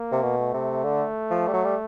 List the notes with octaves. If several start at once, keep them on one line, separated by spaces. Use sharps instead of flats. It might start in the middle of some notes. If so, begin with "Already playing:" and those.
Already playing: A#3
C3
B2
A3
C3
D3
F3
G3
F#3
G3